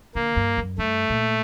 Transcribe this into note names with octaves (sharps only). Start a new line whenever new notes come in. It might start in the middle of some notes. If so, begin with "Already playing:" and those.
D3 A#3
G2
F#2
G2 A3
A#2